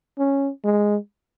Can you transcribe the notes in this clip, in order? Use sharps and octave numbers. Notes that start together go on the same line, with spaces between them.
C#4
G#3